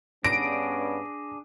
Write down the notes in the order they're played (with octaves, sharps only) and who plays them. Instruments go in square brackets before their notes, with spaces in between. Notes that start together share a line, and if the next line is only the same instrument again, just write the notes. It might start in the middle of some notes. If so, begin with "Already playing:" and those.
[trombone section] G2 B3 C#4 [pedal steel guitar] D4 G#4 [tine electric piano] A#6 [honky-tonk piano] D7